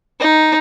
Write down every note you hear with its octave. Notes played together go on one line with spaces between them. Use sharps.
D#4